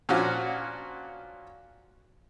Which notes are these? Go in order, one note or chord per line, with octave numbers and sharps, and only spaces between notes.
A#2 F3 C#4 D4 F4 F#4